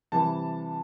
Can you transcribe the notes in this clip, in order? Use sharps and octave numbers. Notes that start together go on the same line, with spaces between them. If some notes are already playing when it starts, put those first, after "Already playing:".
C3 E3 G3 A5